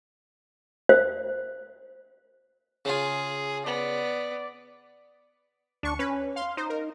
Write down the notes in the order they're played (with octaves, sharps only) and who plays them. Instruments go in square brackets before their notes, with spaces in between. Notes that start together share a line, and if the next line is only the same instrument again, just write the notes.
[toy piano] C5
[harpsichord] C#3 F4 [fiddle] G#4
[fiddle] B3 [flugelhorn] D5
[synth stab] D2 C#6 [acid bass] D4
[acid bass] C#4 [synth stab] B4
[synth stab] F5 C6
[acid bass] D#4 [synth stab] C5
[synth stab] A#4